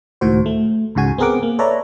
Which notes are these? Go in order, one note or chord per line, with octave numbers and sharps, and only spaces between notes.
C#2 A2 D#3 F#4 C5
A3
C#2 G#2 C#3 F#4 G#5
B3 C4 G#4 A#4 F#5 D6
A#3
A4 B4 C#5 D5 E5 A#5